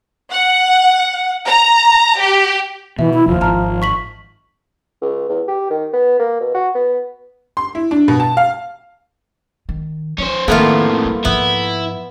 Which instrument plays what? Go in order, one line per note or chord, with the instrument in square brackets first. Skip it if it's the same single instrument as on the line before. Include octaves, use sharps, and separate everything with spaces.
[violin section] F#5
A#5
G4
[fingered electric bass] B2 [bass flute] E3 [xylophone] E5
[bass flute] E4
[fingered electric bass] F1 D#2 [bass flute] F3
[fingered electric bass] G#1 [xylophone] A5 A#5 F6
[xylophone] C#6 B6 F#7
[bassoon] C#2
E2
G4
D#3
B3
A#3
B2
F#4
B3
[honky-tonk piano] C6
E4
D4
B2
A5
F5
[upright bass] D#3
[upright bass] F3 [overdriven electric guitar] C#4 C5
[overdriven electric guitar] F2 A2 [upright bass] D#3 [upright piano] A#3 A4 [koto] B3 E4 F4
[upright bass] G3
[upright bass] G#2 F3 [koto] B3 [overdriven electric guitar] E4